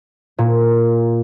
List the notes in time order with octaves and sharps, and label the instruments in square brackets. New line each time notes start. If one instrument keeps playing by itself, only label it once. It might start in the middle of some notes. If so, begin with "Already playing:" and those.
[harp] A#2